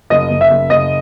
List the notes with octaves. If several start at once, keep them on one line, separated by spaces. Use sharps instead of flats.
F#1 D#5
F#1
E5
F#1
F#1 D#5